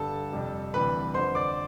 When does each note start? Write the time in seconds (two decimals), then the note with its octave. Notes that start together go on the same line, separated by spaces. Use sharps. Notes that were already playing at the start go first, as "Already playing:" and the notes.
Already playing: G2 D3 G3 A4 A5
0.32 F2 C3 G3
0.74 D2 C3 E3 G3 B4 B5
1.14 F2 D3 F3 C5 C6
1.35 D5 D6